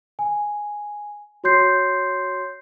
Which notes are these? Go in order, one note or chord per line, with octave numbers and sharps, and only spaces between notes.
G#5
F#4 C#5 C6 G6 C7